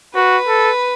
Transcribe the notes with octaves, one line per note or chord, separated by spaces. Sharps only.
F#4 B4
A4